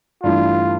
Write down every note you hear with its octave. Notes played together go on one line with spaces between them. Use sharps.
G2 E3 A3 E4 F4